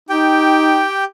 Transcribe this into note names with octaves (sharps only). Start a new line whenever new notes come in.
D#4 G4 G5